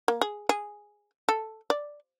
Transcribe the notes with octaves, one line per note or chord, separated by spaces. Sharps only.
A#3
G#4
G#4
A4
D5